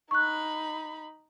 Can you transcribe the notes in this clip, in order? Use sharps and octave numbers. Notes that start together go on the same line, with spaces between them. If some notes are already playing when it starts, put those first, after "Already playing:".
D#4 B5 C#6 F#6